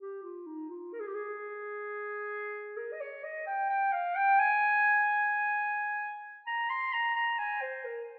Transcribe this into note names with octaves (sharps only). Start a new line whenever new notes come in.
G4
F4
D#4
F4
A#4
G#4
G4
G#4
A#4
D#5
C#5
D#5
G5
G5
F5
G5
G#5
A#5
C6
A#5
A#5
G#5
C5
A#4